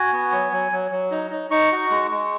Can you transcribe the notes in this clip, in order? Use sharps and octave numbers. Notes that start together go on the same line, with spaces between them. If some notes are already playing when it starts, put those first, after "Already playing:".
Already playing: F#4 G#5
B3
F#3
F#3
F#3
F#3
D#4
D#4
D#4 C#6
F#4
G#3
G#3